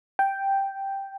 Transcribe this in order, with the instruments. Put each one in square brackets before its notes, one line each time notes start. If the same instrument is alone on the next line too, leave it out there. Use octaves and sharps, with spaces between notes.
[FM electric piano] G5